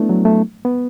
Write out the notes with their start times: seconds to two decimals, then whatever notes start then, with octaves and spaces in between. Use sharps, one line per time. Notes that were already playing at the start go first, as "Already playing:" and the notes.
Already playing: A3 B3 D4 E4
0.09 F#3
0.25 A3
0.65 B3